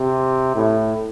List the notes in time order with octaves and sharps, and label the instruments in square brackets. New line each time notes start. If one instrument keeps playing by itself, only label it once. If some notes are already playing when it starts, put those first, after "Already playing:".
Already playing: [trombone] C3
A2